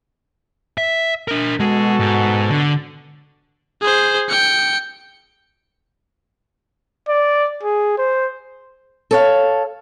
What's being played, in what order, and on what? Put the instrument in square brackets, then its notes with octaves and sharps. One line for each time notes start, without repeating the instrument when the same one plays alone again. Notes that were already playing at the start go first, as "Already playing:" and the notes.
[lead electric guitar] E5
D4 A#4
[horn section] B2 F#4 A4 [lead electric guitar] G#3
[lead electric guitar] G#2
D3
[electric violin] G#4 C5
G5 C#7
[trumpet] D5
G#4
C5
[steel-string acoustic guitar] A4 C#5 F5